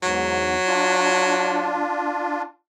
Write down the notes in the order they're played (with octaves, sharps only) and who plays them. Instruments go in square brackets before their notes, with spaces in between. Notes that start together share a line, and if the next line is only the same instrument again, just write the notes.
[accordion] E2 G#2 [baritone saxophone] F#3
[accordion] D4 F4